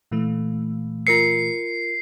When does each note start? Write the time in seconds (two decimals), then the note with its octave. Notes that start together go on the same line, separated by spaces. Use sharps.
0.11 A#2 E3 A3
1.07 F4 A#4 C7 C#7